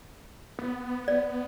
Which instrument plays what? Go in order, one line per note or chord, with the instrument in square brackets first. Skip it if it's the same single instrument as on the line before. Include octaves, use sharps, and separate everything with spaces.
[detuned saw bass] B3
[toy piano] D5